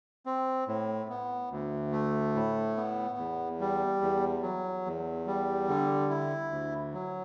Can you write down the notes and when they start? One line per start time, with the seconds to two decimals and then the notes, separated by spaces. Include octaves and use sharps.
0.26 C4
0.68 A2
1.10 B3
1.51 D2
1.92 A3
2.35 A2
2.76 B3
3.18 E2
3.60 G3
4.02 E2
4.43 F#3
4.85 E2
5.27 G3
5.69 D3
6.09 E4
6.51 D2
6.94 F#3